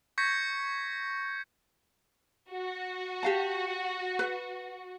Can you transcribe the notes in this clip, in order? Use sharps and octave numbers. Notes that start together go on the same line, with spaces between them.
C#6 G6 G#6 A#6 B6 C#7
F#4
G4 F5 A5
B4